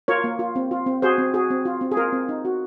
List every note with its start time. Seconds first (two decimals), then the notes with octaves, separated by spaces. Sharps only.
0.08 F4 A#4 C#5
0.24 A#3
0.39 F4
0.56 C4
0.71 F4
0.86 C4
1.02 F#4 G#4 C5
1.18 C4
1.34 F#4 G#4
1.50 C4
1.65 F4
1.81 C4
1.91 G#4
1.97 F4 A#4
2.13 C4
2.29 D#4
2.45 F#4